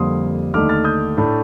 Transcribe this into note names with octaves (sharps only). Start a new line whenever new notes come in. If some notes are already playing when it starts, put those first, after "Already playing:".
Already playing: F2 D3 G3 A#3 C6 D#6
D#2 D3 A3 D#4 D6 F6
F6 A6
D#6 G6
A2 A3 D4